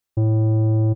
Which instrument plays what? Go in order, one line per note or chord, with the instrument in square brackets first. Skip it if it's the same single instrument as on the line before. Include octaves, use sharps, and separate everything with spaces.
[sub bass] A2